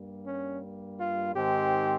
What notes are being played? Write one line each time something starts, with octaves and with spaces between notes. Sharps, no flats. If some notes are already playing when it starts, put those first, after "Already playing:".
Already playing: G2 G3 A#3
C#4
F4
G#2 D#3 G#3 C4 G4